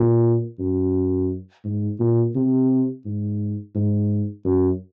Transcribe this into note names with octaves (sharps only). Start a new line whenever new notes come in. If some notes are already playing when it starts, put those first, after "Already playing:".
Already playing: A#2
F#2
G#2
A#2
C3
G#2
G#2
F#2